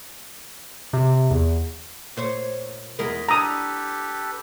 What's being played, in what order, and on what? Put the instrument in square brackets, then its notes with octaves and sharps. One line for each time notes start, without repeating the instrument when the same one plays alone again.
[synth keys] C3
E2
[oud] A#2 C5 C#5
[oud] E2 G#3 A#4 [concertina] D#5 B5
[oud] D4 [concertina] G4 A4 B4 [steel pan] A#5 D#6